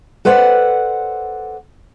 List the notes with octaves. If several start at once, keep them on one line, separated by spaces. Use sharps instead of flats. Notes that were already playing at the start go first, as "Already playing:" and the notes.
A4 B4 C5 D5 F#5